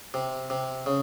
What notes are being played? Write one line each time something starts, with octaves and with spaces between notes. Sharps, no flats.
C3
C3
C#3